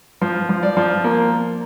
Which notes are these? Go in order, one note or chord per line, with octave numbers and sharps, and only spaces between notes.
F3
F3
D5
F3
A#3